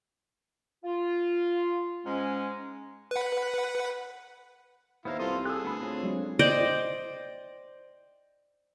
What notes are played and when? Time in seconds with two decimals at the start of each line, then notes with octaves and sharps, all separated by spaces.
0.84 F4
2.06 G#2 G#3 C#4
3.11 B4 F#5
5.05 D#2 B3 E4 C5 F5 A#5
5.19 C2 F4 A4 C6 D#6
5.45 G#4 A4 E6 F#6
5.64 D2 B3 B5
5.81 C4 F4 C#5
6.03 F#3 G#3 D4
6.39 C5 D5 D#5 G5